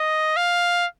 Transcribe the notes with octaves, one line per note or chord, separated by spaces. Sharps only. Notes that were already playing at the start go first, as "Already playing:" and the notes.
Already playing: D#5
F5